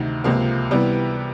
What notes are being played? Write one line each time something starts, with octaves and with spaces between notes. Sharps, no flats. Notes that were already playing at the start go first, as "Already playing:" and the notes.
Already playing: D2 C3 D#3
C#2 C3 F3 A#3
C3 E3 G3 B3